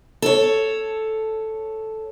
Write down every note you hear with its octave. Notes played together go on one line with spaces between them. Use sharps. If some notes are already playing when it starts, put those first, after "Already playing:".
A4 C#5